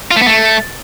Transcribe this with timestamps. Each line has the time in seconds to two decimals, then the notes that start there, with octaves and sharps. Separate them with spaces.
0.11 F4
0.16 A3
0.21 B3
0.27 A3